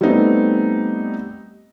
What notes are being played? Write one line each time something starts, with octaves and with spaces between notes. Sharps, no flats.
G3 A3 B3 C4 D#4